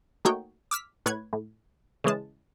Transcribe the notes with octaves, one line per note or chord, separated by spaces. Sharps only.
A3 A#3 D#4 F#4 C#5 G5
D6 E6 F6 B6
A2 B4 C#5 F#6 G#6
A2
C#3 E3 G#3 A5